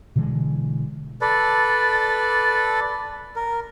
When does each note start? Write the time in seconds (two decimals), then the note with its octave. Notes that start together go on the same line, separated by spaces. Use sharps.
0.16 B2 D3 E3 G#3
1.21 A4 B4 D5
3.36 A#4